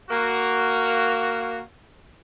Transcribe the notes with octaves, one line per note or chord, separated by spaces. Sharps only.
A#3 F#4